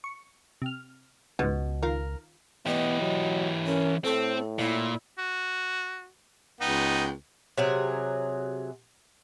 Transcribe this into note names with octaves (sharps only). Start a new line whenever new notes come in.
C#6
C3 F6
C#2 G#2 B2 B3
D#3 F4 A#4
E3 B3 G4 D#5
F#3
C#4 A#4
A2 C4 A4
A#2 E4
F#4
C#2 B3 D#4 G5
C3 F#3 G#4